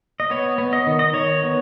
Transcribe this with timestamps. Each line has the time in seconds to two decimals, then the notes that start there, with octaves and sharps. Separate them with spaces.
0.20 D#5
0.30 B3 C#5
0.58 B3
0.73 D#5
0.87 D#3
0.99 D#5
1.14 D#3 C#5
1.43 B3